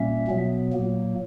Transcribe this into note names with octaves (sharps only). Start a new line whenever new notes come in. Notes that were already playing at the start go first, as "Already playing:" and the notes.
Already playing: A#2 G3 A#3 C#4 E5
B2 F#3 B3
A#2 F#3 A#3